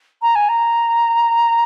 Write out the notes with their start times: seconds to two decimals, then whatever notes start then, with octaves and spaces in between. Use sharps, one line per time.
0.22 A#5
0.35 G#5
0.48 A#5